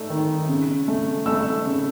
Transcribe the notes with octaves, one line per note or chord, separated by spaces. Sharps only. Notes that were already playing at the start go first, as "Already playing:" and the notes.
Already playing: A3 E6
D#3
C#3
A3
A3 E6
C#3